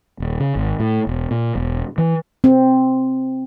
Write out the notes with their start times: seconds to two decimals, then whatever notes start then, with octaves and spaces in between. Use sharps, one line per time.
0.20 D#1
0.40 C#3
0.56 G#1
0.80 A2
1.07 E1
1.31 A#2
1.55 E1
1.98 E3
2.44 C4